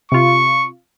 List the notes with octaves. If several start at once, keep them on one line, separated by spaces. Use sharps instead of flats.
C3 F4 C#6